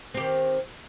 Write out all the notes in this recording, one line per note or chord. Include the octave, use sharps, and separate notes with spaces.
D#3 C4 G4